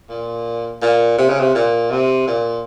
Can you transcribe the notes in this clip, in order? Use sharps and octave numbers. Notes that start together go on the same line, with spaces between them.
A#2
A#2
C3
C#3
C3
A#2
C3
A#2